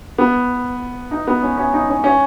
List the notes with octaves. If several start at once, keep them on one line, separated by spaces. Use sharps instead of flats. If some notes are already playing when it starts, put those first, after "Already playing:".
B3
D#4
B3
C#4
C#4
D#4
C#4
C#4